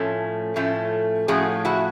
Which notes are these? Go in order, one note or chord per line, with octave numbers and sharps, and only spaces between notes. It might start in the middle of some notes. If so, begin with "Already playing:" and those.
Already playing: A2 F3 A3 C#4
A2 F3 A3 C#4
A2 F3 A3 C#4 F#4 G#4
E4 F#4